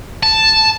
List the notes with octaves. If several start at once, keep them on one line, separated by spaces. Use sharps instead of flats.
A5